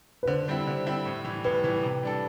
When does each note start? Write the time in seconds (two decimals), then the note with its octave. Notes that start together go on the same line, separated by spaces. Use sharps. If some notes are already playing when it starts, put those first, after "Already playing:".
0.23 B4
0.27 D3 C5
0.48 G3 C4 E4
0.67 D3
0.86 G3 C4 E4
1.05 A2
1.24 E3 G3
1.44 A2 B4
1.64 E3 G3
1.83 C3
2.03 G3 D4 A4